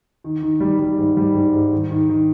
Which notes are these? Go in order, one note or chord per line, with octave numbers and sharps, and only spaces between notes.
D#3
D#3
G3
G3
G#2
G3
G#2
G#2
D#3
D#3
D#3